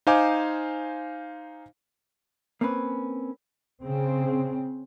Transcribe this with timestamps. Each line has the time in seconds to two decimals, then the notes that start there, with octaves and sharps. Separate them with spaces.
0.07 D#4 C5 F5 G#5 D6
2.61 A#3 C4 C#4 B4
3.82 C#3 C4